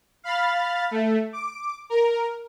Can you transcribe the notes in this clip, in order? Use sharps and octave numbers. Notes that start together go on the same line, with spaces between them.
F5 B5 F6 A6
A3
D6
A#4